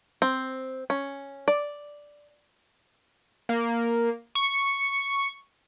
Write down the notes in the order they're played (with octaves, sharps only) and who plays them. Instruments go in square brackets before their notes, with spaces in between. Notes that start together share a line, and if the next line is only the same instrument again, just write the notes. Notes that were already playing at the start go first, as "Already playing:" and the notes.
[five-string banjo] C4
C#4
D5
[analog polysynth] A#3
C#6